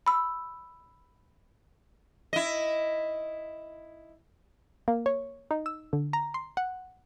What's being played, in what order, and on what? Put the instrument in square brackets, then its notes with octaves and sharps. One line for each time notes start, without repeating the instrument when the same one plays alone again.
[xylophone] B5 E6
[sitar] E4 D#5
[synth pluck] A#3
C#5
D#4
E6
D3
A#5
C6
F#5